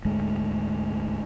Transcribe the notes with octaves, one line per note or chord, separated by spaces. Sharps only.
D2 G#2 G#3 A3